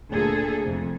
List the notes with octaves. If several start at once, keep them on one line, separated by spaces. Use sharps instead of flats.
D2 A#2 G#4 A4
F2 C3